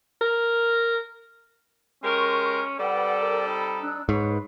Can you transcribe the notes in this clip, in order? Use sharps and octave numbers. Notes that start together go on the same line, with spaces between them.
A#4
G#3 C#4 G4 A#4 C6 C#6
G3 C4 A4 B4 D5 F#5 G5
A#4
D#4 B5
D4 E6 F#6
G#2 B4 C#5